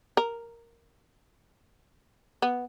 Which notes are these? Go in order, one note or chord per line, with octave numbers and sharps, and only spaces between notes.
A#4
B3